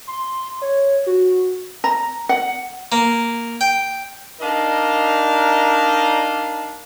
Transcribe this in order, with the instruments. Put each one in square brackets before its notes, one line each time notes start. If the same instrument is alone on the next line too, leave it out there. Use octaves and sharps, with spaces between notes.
[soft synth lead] C6
C#5
F#4
[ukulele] A#5
F#5
[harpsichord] A#3
G5
[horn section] D4 D#4 A#4 D5 D#5 F5